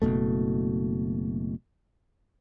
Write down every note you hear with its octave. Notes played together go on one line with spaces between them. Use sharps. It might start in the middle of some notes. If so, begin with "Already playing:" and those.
F#1 C#2 B2 A3